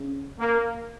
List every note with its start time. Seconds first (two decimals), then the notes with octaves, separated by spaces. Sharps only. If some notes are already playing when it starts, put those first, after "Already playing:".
Already playing: C#3
0.40 A#3